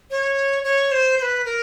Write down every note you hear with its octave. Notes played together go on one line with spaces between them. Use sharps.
C#5
C#5
C5
C5
B4
A#4